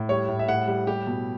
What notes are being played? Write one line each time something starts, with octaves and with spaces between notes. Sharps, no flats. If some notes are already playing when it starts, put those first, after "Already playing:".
Already playing: A2
G3 C#5
A2
E5
A2 F#5
G3
G3 G4
B2